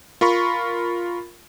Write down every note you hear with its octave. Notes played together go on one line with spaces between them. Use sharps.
F4 A#4 B5 C#6